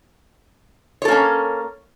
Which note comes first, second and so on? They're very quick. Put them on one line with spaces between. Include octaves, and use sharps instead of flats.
C#5 A4 A#3 C#4